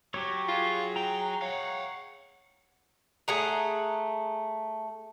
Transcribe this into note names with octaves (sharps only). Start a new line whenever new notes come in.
F#3 G4 C#5
F4 G#4
G5 A#5
C#5 F5 F#5
A3 G#4 F#5 A#5